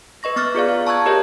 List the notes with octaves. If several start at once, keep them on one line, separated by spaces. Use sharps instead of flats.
B4 D#5 C#6 A#6
B3 C#6 D6 F6 F#6 A6
F4 G#4 D5 F5
F5
A5 A#5 C#6 E6 F#6 G#6
G4 A#4 C#5 D#5 F5 G6